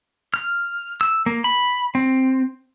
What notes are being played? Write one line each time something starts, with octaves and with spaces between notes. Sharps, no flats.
F6
E6
A#3
B5
C4